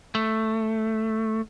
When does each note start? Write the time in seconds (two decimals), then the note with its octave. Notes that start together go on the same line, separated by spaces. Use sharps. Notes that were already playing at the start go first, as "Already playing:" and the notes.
0.15 A3